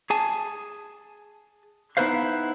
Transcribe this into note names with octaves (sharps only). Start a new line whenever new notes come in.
G#4 G#5 A5
B3 D#4 E4 B4 C5 F5